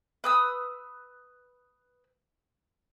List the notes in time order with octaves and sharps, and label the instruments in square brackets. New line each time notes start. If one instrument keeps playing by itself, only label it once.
[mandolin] B4 D#6 E6